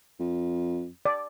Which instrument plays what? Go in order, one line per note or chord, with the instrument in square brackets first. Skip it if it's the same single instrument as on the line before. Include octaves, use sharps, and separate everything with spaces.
[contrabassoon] F2
[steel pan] D5